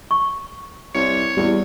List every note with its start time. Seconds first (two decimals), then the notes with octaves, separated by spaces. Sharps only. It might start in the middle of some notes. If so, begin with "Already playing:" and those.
0.11 C#6
0.95 C2 C#5
1.37 E2 G3